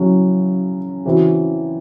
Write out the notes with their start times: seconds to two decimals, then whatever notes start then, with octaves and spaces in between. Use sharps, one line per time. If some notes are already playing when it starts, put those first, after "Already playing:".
Already playing: C#3 F#3 C#4 E4
1.05 C#3 E3 C4 F#4